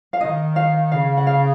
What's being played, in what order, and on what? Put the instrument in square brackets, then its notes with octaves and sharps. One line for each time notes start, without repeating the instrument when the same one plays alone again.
[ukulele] F5
[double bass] D#3 [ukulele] D#5
[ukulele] F5
[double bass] C#3 [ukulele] F5
[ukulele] F#5
F5